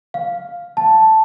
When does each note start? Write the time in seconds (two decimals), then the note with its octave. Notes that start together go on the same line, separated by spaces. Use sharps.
0.14 F5
0.77 A5